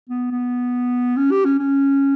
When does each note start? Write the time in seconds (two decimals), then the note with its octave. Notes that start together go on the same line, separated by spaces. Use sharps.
0.10 B3
0.31 B3
1.17 C#4
1.31 G4
1.45 C#4
1.59 C#4